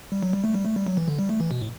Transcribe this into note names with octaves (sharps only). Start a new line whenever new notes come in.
G3
F#3
G3
A3
G3
A3
G3
F#3
E3
D3
G3
A3
E3
B2
A2